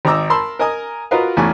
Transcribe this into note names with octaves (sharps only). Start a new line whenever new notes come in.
G#1 D#4 A#5 D6 E6
A#4 A5 B5 C6 E6
A#4 D#5 G#5 D#6
F4 F#4 A#4 B4 D#5 F5
A1 E2 A3 G#5 C#6